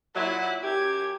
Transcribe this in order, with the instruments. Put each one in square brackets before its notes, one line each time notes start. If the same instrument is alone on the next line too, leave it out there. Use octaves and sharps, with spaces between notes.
[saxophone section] A#2 F#3 [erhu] E4
[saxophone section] F#2 G4 [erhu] G#6